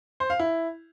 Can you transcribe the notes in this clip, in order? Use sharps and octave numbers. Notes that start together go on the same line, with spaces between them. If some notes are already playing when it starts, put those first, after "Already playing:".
C5
F5
E4